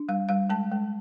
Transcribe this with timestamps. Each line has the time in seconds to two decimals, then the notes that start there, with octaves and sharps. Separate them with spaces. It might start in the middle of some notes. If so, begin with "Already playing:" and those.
Already playing: D4
0.09 G3 F5
0.29 G3 F5
0.50 G#3 A5
0.72 G#3